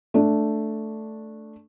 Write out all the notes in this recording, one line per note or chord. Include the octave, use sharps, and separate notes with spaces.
A3 D4